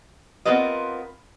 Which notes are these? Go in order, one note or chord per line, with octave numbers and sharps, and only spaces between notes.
B3 C4 F4 A#4 B4 D#5